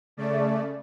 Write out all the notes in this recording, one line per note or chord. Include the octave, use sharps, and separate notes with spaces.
C#3 A3 D5